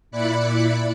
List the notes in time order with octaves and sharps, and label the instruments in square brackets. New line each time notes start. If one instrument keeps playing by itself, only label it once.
[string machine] A#2 E4 D5 B5 F#6 C#7